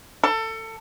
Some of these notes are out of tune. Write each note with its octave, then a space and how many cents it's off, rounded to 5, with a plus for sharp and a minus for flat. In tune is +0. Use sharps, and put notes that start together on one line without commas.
A4 +25